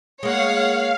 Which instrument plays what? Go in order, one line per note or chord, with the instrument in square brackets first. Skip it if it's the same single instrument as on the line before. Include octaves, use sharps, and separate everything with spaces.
[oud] G#3 A#3 [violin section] C#5 F#5 [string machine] F5